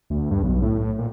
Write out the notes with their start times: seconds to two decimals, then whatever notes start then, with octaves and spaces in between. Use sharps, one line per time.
0.10 D2
0.31 G2
0.43 B1
0.63 A2
0.78 A2
0.98 A#2